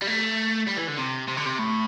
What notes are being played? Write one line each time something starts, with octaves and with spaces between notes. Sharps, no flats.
G3
A3
G3
E3
D3
C3
C3
D3
C3
A2